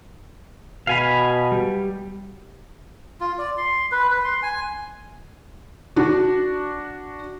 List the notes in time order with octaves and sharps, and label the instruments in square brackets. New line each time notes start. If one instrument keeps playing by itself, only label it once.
[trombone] B2 [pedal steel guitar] F5 G#5 B5
[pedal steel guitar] G3
[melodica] F4
D5
C6
B4
B4
C6
G#5
[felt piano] D4 F#4